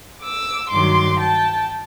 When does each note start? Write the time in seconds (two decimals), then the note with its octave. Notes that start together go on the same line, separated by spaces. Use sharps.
0.22 D6 E6
0.70 G2 D#3 F#3 C6 D6
1.18 G5 A5